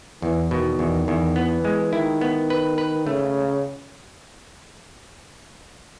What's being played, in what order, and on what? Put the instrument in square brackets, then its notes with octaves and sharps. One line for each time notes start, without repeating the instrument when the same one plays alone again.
[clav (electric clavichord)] E2 [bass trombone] E3
[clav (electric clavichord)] B2 [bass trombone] D#3
[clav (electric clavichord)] E2 [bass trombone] D#3
[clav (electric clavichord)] E2
[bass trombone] E3 [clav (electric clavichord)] B3
[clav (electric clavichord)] G#3
[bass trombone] D#3 [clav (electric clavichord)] E4
[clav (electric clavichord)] B3
B4
B4
[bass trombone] C#3 [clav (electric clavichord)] A3